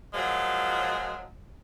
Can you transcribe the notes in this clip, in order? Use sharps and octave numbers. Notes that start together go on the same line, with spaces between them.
A#2 F3 F#3 G#3